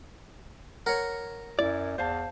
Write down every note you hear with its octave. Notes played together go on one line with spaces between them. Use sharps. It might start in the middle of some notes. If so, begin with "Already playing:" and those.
A#4 C#5 F#5
F#2 E4 D5
E2 C5 F5 A5